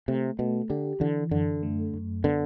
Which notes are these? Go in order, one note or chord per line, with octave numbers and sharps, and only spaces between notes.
C3 A3
B2 A3
D3 G4
D3 E3
F#2 D3
A3
F#2
D3 B3